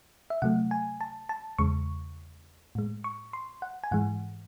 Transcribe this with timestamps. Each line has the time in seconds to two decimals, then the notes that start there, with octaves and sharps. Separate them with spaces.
0.30 E5
0.42 C3 F#3 A3 F#5
0.71 G#5
1.01 A5
1.29 A5
1.59 E2 C#3 G#3 C#6
2.75 A2 G#3
3.04 C#6
3.33 C6
3.62 F#5
3.84 G#5
3.91 G#2 E3 G#3 F#5